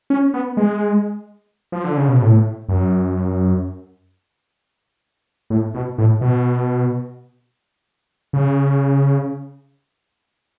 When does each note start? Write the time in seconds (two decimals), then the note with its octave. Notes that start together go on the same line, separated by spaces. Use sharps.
0.10 C#4
0.34 B3
0.57 G#3
1.72 F3
1.84 D3
1.97 C#3
2.09 B2
2.22 A2
2.69 F#2
5.50 A2
5.74 B2
5.98 A2
6.21 B2
8.33 C#3